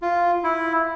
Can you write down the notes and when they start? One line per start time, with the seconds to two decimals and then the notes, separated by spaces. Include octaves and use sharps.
0.02 F4
0.44 E4